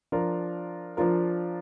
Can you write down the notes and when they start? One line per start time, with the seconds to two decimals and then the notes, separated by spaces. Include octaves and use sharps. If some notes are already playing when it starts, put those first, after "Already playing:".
0.12 F3 D4 F4 A#4
0.97 F3 D4 F4 A#4